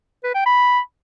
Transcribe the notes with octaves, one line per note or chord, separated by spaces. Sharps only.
B4
G5
B5